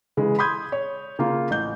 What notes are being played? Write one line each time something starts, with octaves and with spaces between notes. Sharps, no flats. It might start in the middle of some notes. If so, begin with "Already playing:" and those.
C#3 E3 G#3
B5 C6 D#6 G6 G#6
C#5
C#3 A#3 F4
A1 G6